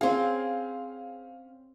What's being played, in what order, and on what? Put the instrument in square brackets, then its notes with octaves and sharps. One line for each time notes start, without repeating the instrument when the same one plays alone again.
[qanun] C4 G#4 [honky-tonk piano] C#4 F5